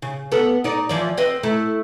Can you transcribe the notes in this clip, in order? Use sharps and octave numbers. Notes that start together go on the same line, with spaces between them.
C#3
B3 A4
D#4 D5
E3 F3 D5
C4 B4 D#5
A3 E4